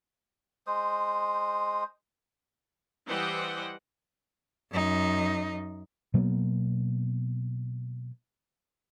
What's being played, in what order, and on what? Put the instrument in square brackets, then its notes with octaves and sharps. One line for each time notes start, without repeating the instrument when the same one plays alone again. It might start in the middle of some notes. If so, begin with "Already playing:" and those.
[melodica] G#3 C5 D#6
[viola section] E3 G3 C5 D#5 F#5 G5
[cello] F#2 D#4
[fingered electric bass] B2 F#3 A#3 B3